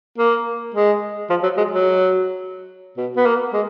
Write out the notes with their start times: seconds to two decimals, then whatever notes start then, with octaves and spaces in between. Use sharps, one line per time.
0.18 A#3
0.74 G#3
1.30 F3
1.43 F#3
1.57 G#3
1.71 F#3
2.97 B2
3.16 B3
3.25 A#3
3.53 G#3